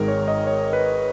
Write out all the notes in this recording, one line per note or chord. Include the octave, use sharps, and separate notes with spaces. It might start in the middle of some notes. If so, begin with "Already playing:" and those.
Already playing: G#1 G#2 D#3 G#3 G#4 A#4
C#5
D#5
C#5
B4